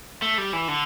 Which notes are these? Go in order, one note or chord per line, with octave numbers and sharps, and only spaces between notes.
A3
G3
E3
D3